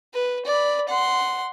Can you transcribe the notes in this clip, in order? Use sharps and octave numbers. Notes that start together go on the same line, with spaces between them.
B4
D5 B5
F#5 C6